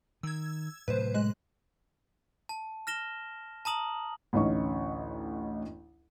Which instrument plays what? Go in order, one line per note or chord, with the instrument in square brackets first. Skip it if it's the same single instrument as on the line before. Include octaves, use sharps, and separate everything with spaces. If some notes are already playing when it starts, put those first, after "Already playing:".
[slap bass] D#3 [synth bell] E6 G#6
[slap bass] A2 C3 F#3 [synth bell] B4 C5
[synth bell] G#3 F#6
[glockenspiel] A5
F6 A#6 E7 G7
A5 A#5 D#6 F#7
[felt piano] A1 D2 A2 C#4 D#4 C#6